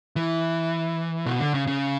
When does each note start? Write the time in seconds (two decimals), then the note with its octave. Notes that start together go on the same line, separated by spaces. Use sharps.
0.16 E3
1.26 B2
1.40 D3
1.54 C#3
1.67 C#3